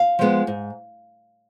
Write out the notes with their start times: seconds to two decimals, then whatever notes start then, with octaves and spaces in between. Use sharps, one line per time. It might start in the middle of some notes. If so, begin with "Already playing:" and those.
Already playing: F5
0.19 F3 G#3 B3
0.47 G#2